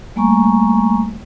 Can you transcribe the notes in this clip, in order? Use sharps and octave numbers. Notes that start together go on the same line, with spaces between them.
G3 A3 A#3 G#5 A#5 C#6